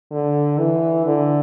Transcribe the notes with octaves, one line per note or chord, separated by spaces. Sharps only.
D3
E3
D3